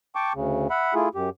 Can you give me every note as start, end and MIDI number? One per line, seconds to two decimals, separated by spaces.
0.15 0.33 79
0.15 0.33 81
0.15 0.33 85
0.15 0.33 86
0.35 0.68 38
0.35 0.68 49
0.70 0.94 76
0.70 0.94 78
0.70 0.94 83
0.94 1.09 57
0.94 1.09 64
0.94 1.09 65
0.94 1.09 68
1.15 1.30 42
1.15 1.30 67